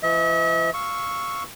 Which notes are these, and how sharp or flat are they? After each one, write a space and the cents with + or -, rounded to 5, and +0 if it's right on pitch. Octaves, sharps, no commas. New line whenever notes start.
E3 +45 E5 -45
F5 +0 C#6 +0 E6 -5